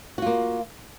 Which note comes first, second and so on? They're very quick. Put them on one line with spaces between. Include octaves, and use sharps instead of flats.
F#4 F4 A#3